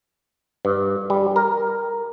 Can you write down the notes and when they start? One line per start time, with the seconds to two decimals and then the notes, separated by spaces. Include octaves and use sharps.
0.65 G2
1.10 G3
1.36 A#4